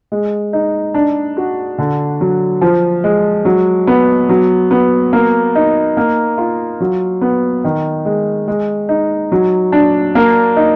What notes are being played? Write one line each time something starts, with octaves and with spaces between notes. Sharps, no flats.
G#3
D#4
D4
F#4
D3
F#3
F3
G#3
F#3
B3
F#3
B3
A#3
D#4
A#3
F4
F#3
B3
D#3
G#3
G#3
D#4
F#3
D4
A#3
D#4